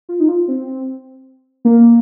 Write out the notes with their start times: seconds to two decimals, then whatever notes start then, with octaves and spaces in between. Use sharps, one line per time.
0.09 F4
0.20 D#4
0.28 F4
0.48 C4
1.65 A#3